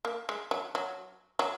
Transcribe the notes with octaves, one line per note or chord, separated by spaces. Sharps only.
A#3
G#3
F#3
F#3
F#3